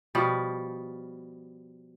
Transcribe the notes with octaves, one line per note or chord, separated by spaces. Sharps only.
B2 F3 G3